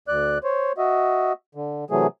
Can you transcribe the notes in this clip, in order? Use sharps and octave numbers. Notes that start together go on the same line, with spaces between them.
D2 D5 F#6
C5 C#5
F#4 D#5 E5
D3
C3 E3 F#3 A3 G#4